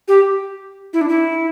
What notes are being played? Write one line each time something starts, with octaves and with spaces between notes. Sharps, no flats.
G4
E4
D4
E4